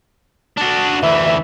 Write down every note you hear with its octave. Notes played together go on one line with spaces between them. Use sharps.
D4 F#4
D2 E3 E5